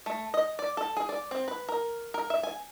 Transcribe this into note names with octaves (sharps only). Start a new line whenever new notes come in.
A3
D#5
D5
A4
G#4
D5
C4
B4
A#4
A#4
E5
G#5